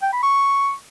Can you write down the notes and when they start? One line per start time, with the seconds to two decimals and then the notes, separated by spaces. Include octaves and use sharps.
0.02 G5
0.13 B5
0.23 C#6